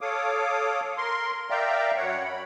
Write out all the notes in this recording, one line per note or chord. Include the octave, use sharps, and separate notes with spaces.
A4 C#5 F5 D6 D#6
A#4 C6
A#4 D5 E5 F5 G5 A#5
F#2 C#5 F#5
B5